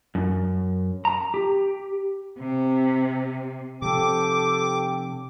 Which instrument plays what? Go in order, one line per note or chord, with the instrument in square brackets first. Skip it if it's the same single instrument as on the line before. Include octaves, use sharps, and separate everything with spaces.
[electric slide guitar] F#2
A#5
G4
[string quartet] C3
[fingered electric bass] C3 F3 C4 [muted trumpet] G4 [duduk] A4 [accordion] D6